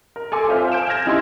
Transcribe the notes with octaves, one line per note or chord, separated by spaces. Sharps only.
A#4
A4 G#5 C6 D6
C4 F4 C5 E5 F6
G#5 G6 D7 E7
F6 G#6 A#6 E7
C#4 D#4 E4 G4 G#5 C6